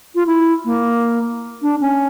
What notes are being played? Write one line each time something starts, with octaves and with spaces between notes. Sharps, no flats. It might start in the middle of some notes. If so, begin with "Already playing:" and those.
F4
E4
A#3
D4
C#4